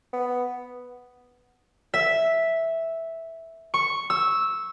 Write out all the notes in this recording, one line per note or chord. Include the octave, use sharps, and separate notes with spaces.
B3
E5
C#6
E6